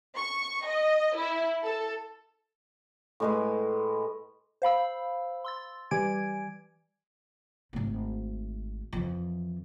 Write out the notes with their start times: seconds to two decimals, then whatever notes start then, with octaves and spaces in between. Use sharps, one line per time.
0.16 C#6
0.65 D#5
1.16 E4
1.63 A4
3.20 A2 G#3 B4
4.62 C5 F5 B5 E6
5.44 C6 E6 A6
5.91 E3 G3 G4 G#5 G#6 D7
7.73 G#1 A3
8.93 F2 E3